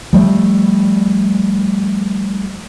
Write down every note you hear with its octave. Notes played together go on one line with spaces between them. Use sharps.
F3 G3 A3